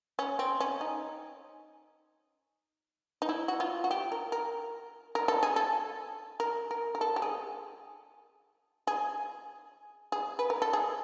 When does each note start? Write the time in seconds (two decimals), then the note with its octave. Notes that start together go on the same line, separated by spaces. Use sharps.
0.19 C#4
0.39 C4
0.60 C#4
0.81 D#4
3.22 D#4
3.29 E4
3.48 F#4
3.60 F4
3.84 F#4
3.91 G4
4.12 A#4
4.32 A#4
5.15 A#4
5.28 A4
5.43 G#4
5.56 A4
6.40 A#4
6.71 A#4
6.95 A#4
7.01 A4
7.16 G4
7.22 G#4
8.87 G#4
10.12 G#4
10.39 B4
10.50 A#4
10.62 A4
10.73 G#4